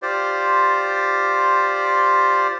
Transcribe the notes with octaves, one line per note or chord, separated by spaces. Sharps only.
F4 G4 C5 D5